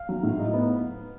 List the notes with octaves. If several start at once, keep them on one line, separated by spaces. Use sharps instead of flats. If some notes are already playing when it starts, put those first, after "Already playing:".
Already playing: F5
F#3
A2
D#4
B3